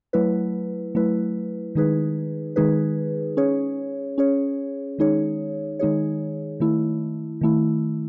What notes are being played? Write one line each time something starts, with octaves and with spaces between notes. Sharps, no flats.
F#3 A3 E4 B4
F#3 A3 E4 B4
D#3 G#3 D#4 G#4 B4
D#3 G#3 D#4 G#4 B4
C#4 G#4 C#5
C#4 G#4 C#5
D#3 G#3 D#4 G#4 C#5
D#3 G#3 D#4 G#4 C#5
D#3 A3 E4
D#3 A3 E4